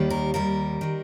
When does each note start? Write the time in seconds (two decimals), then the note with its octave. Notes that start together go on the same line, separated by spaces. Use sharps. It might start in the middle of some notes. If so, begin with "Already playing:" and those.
Already playing: D#2 D#3 G3
0.10 A#4
0.34 D#2 D#3 G3 A#4
0.81 D#3 G3